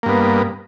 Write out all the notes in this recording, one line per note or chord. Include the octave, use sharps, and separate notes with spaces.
G2 A#3 B3